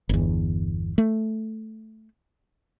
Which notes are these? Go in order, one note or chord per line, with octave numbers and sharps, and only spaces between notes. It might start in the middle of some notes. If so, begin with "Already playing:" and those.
G1 E2
A3